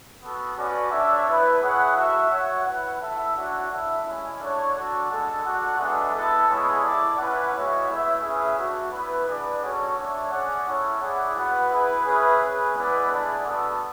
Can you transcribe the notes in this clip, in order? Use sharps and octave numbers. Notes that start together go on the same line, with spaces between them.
B3 F#4 A4
C#4 F#4 B4 D5
D4 A4 C#5 E5
B3 E4 B4
E4 G#4 C#5 F#5
F#4 A4 E5
F#4 C#5 F#5
E4 B4 F#5
E4 A4 E5
D4 F#4 C#5 F#5
E4 A4 E5
G#3 C#4 E4
D4 A4 C#5 F#5
D4 F#4 A4
G#3 D4 A4
F#4 A4 D5 F#5
G#3 B3 D4 A4 E5
B3 E4 A4
G#3 B3 E4 G#4 C#5
E4 A4 D5
C#4 E4 B4 F#5
G#3 B3 F#4 C#5 E5
A3 E4 B4 E5
C#4 G#4 B4 E5
A3 D4 F#4
B3 E4 B4
D4 G#4 B4 D5 F#5
C#4 F#4 A4 C#5
D4 A4 C#5 E5
C#4 G#4 D5 F#5
C#4 E4 A4 C#5
E4 G#4 D5 F#5
B3 F#4 B4 F#5
E4 G#4 B4
C#4 G#4 B4 E5
C#4 G#4 B4
G#3 B3 E4 B4 D5
A3 D4 G#4 D5 F#5
B3 D4 F#4 A4